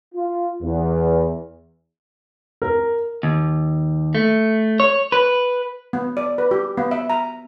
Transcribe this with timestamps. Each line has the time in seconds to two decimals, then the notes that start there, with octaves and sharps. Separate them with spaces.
0.15 F4
0.62 E2
2.62 A#4
3.23 D#2
4.15 A3
4.80 C#5
5.12 B4
5.93 B3
6.17 D5
6.38 B4
6.51 G4
6.78 B3
6.91 E5
7.10 A#5